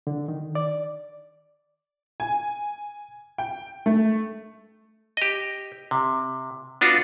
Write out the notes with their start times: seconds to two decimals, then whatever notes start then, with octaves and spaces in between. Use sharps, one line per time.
0.07 D3
0.28 D#3
0.55 D5
2.20 G#5
3.38 G5
3.86 A3
5.17 G4 D#5
5.91 C3
6.81 B3 D4 F4 F#4